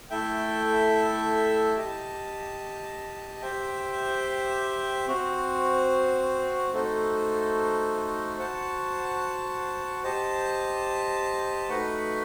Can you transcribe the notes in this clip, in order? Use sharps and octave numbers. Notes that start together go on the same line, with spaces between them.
A3 E4 A4 E5 G5
G4 D#5 A5
G4 C5 E5 G5
C4 F#4 C5
A3 D#4 F#4 A4 C5
F#4 C5 F#5 A5
G4 C5 D#5 A5
A3 D#4 F#4 B4 F#5